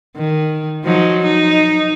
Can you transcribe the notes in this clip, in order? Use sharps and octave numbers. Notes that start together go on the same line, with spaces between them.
D#3
F3 F#3 D#4
D#4